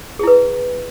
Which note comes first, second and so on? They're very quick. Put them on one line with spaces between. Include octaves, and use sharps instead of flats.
G#4 E4 B4